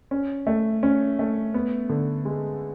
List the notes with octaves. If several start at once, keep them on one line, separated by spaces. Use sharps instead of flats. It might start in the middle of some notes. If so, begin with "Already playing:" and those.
C#4
A3
C#4
A3
B3
D3
G#3